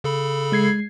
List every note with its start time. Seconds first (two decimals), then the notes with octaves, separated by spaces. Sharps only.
0.04 C#3 A4 B5
0.52 G#3 G#6 C7